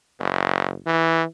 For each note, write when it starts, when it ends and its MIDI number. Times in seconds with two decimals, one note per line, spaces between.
0.19 0.78 30
0.86 1.23 52